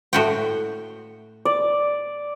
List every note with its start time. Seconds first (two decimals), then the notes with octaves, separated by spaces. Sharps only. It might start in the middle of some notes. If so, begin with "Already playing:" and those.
0.13 A2 F#4 G5
1.45 D5